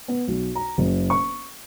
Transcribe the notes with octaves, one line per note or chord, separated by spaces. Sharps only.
B3
B1
A#5
F#1
C#6